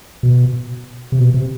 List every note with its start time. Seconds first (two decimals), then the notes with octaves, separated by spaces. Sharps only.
0.23 B2
1.12 C3
1.19 B2
1.34 C3